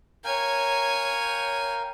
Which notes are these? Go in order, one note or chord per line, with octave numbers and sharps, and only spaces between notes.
A#4 C#5 F5 G5 G#5